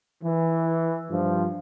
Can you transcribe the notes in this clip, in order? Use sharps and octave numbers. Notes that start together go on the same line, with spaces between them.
E3
G2 F3